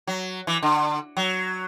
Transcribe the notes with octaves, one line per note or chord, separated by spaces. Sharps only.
F#3
E3
D3
F#3